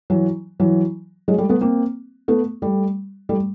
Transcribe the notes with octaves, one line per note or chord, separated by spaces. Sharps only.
E3 F#3
E3 F#3
F#3 G#3
G3 A3
A3 B3
A#3 C4
A3 B3
G3 A3
G3 A3